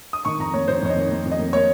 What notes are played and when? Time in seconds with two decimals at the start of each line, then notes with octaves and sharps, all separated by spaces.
0.13 D#6
0.25 D#3 C#6
0.39 F2 A#5
0.54 A#3 C#5
0.68 F2 C5
0.82 F2 C#5
0.90 D#5
0.96 D#3
1.11 A#3
1.25 F2
1.32 D#5
1.39 A#3
1.53 A#3 C#5